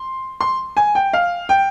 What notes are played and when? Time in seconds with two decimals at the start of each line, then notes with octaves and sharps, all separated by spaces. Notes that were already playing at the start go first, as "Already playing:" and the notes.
Already playing: C6
0.41 C6
0.77 G#5
0.95 G5
1.13 F5
1.49 G5